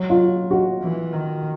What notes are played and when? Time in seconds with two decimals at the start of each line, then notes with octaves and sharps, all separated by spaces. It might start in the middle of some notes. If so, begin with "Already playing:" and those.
Already playing: F#3
0.10 F4
0.51 F#4
0.82 E3
1.13 D#3